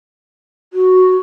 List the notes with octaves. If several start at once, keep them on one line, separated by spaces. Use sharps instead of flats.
F#4